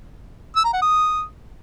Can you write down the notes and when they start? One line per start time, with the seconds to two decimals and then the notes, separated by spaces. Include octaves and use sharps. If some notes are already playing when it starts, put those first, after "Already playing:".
0.56 E6
0.64 A#5
0.73 F#5
0.82 D#6